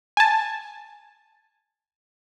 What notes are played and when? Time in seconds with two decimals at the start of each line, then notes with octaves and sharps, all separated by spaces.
0.17 G#5 A5